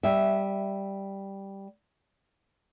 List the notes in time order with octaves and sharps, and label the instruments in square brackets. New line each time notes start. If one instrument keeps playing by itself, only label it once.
[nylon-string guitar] G3 E5